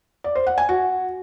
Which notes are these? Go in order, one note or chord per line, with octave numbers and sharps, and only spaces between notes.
D5
C5
F#5
G#5
F#4